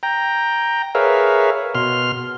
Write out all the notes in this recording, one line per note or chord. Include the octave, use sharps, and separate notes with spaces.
G5 A#5
G#4 A#4 B4 C#5 E5 F5
B2 C6 F6